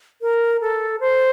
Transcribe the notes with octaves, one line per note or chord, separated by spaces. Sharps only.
A#4
A4
C5